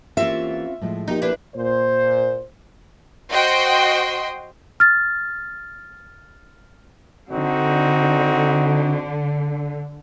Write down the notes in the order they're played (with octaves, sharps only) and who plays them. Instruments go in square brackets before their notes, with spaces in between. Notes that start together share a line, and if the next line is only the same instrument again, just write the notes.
[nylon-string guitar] E3 A#3 G4 [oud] C4 C#4 F4 [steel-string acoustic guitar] E5
[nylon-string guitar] A2 F3 G#3
[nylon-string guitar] F3 A#3 G4 [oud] D#4
[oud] D4 E4 B4
[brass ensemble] A#2 C5
[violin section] F#4 C5 D#5 G5 C6
[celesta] F6 A6
[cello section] D3 [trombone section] C4 D#4 F#4